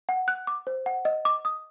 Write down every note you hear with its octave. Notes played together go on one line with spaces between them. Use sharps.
F#5
F#6
D6
C5
F#5
D#5
D6
D#6